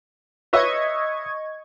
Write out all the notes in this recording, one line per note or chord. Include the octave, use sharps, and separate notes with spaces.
B4 C#5 D#5 E5 C#6 G#6